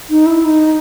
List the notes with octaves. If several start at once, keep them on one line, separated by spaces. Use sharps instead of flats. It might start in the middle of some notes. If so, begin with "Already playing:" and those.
D#4
E4
D#4